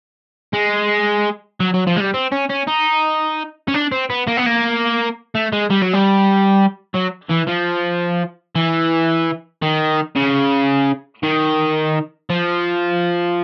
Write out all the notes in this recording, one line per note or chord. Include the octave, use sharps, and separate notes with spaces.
G#3
F#3
F#3
F3
G#3
G3
C4
C#4
C#4
D#4
C#4
D4
C4
B3
A#3
B3
A#3
A3
G#3
G3
F#3
G3
F#3
E3
F3
E3
D#3
C#3
D#3
F3